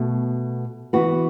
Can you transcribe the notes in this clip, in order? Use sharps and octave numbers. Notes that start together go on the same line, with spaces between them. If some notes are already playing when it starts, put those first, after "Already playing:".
Already playing: B2 A3
E3 B3 F#4 B4